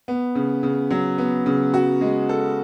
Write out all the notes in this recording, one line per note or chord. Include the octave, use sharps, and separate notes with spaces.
B3
C#3
C#3
F#3
B3
C#3
F#4
G#3
A4